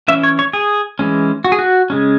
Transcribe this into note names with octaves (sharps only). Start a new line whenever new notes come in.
E3 C#4 E5
C#5
C#5
G#4
E3 G#3 C#4
F#4
G#4
F#4
C#3 G#3 C#4